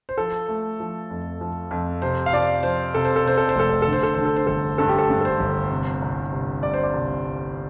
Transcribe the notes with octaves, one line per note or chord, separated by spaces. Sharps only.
C5
F3 A4
A3
F3
F2
F3
F2
C3 C5
F5
F3 D5
F3 C5
C3 A4
C5
A4
C3 C5
A4
C5
F1 A4
C5
D3 A4
C5
A4
D3 C5
A4
C5
G1 A4
G2 A4
G4
A4
G2
A4
C5
G1
C3
C2
C3
C2 D5
C5
D5
C2